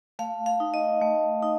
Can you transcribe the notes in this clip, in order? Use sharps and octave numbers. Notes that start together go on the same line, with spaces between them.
A3 F5
F5
D#4
D#5
A3
D#4